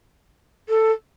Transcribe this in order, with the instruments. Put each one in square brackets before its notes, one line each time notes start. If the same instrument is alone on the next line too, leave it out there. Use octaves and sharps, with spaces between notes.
[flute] A4